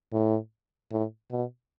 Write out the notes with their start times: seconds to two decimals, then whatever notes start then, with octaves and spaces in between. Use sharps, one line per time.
0.12 A2
0.92 A2
1.31 B2